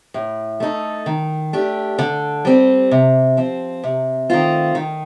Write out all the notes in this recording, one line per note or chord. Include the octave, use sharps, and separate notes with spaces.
A2
A3 D#4 A4
D#3
A3 D4 G4
D3
G3 C4
C3
F3 C4
C3
D#3 A3 C4 F4
D#3